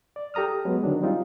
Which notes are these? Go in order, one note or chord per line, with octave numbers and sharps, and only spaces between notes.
D5
G4 A4 A#5 D#6 F6
F#3 G#3 B3
D3 D#3 F#3 D4
G3 C4 D#4 F4